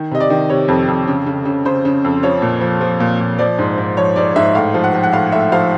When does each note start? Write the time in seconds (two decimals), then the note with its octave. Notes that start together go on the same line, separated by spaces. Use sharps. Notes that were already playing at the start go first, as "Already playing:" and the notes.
Already playing: D#3
0.11 C3 D#5
0.20 D5
0.30 D#3
0.49 C3 C#5
0.68 F2
0.88 F2
1.07 C#3
1.26 C#3
1.45 C#3
1.65 C#3 C5
1.85 C#3
2.05 F2
2.23 F3 C#5
2.42 A#2
2.61 F3
2.81 F3
3.00 A#2
3.20 A#2
3.39 F3 D5
3.59 G#2
3.78 G#2
3.97 F3 C#5
4.16 G#2 D5
4.36 G#2 E5
4.55 A2 F5
4.74 F3
4.84 F#5
4.94 F3
5.03 F#5
5.13 A2 F5
5.32 A2 E5
5.52 F3 F5